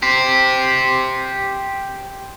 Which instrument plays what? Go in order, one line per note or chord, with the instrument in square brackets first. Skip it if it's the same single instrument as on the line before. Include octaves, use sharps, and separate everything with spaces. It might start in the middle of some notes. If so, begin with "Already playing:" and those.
[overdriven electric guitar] G4 C5